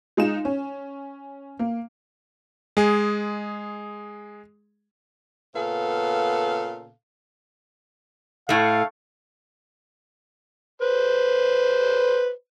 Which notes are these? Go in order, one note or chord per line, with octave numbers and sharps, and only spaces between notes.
G#3 D#4 F4 E7
C#4
A#3
G#3 G#4
A#2 C#3 B3 A4 F5
A2 A3 F5
B4 C5